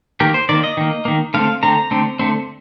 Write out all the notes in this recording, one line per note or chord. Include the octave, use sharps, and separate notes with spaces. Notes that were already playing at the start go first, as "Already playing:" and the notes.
D#3 A#3 G4
C5
D#3 A#3 D5
D#5
D#3 A#3
D#3 A#3
D3 A3 C4 F5
D3 A3 C4 A#5
D3 A3 C4
D3 A3 C4